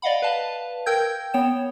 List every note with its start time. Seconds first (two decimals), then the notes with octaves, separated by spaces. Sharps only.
0.02 D5 D#5 F5 F#5 B5
0.22 B4 F5 A5
0.86 A#4 G5 E6 G6 G#6
1.34 B3 C#5 G5 E7